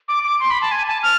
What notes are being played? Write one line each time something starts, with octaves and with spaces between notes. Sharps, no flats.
D6
D6
C6
B5
A5
G#5
A5
F6